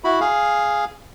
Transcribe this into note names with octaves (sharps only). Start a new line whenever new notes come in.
E4 F#4 B5
G#4 F5